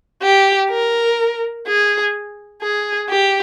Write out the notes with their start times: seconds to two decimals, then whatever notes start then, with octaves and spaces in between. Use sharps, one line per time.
0.22 G4
0.70 A#4
1.67 G#4
2.62 G#4
3.10 G4